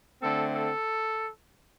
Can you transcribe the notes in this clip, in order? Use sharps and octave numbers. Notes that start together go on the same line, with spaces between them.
D3 A3 C4 A4
A4